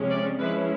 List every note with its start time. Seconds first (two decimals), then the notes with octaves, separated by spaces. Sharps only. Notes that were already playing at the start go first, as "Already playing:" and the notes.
Already playing: C3 F3 G#3 C#4
0.10 D5
0.38 F3 G#3 C#4 E4 B4